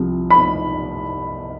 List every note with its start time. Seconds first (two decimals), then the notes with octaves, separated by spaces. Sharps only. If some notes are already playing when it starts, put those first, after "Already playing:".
Already playing: C2 C3 F3
0.30 B5